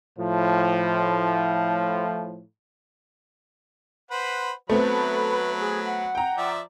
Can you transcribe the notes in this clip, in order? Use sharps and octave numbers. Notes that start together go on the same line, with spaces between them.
A2 F3
B4 C5 F#5
F#3 A3 B3 C4 B4 B5
G#4
F#5
G5 A#5
F3 D5 E5